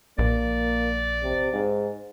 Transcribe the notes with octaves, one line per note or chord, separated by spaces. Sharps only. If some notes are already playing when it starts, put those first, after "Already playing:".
A#1 A#3 D5
C3
G#2